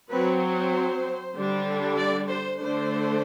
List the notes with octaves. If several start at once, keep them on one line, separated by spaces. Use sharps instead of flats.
F#3 C4 B4
C5
D3 G3 D4
D5
C5
D3 A3 D4 C5